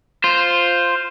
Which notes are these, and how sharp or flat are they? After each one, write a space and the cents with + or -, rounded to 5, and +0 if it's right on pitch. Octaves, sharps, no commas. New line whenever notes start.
F4 +0 C5 +0